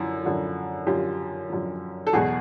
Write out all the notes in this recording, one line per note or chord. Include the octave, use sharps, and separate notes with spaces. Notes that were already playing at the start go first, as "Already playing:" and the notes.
Already playing: F#2 D3 F3 E4
F#2 D3 F3
F#2 D3 F3 F4 G4
F#2 D3 F3
A4
E2 B2 F#3 F#4 G#4